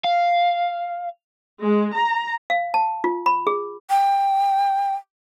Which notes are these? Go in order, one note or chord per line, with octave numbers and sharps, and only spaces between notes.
F5
G#3
A#5
F5
A5
F4
B5
G#4
G5